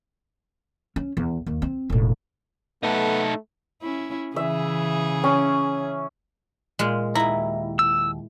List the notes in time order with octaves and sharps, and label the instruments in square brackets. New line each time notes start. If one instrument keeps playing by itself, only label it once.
[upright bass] C#4
E2
D#2
C4
E1 A2
[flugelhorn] A3 [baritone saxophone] B3 [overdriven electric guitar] D#4 A4
[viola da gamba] C#4 E4
[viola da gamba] C#3 E3 G#4 [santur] E5
[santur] C#4
[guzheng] A#2 G#3
[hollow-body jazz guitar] D#2 A#5 [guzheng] E4
[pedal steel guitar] E6